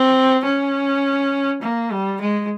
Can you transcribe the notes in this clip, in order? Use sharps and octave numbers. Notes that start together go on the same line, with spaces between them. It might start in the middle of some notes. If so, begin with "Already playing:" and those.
Already playing: C4
C#4
A#3
G3
G#3